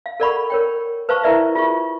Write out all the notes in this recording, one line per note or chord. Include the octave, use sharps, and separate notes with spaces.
F5
A4 A#4 D5 F#5 B5 C#6
A#4 C#5 G5
B4 C5 F5 A5 C#6
E4 A#4 B4 D5 E5
F4 G#4 C#6